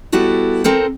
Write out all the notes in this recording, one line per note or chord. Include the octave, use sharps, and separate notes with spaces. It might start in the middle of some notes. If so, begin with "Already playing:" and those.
G3 B3 E4 F#4 A4
C4 A4 A#4 C5